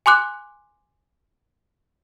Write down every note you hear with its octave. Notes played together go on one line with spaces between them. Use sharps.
G#5 C6 D6 F#6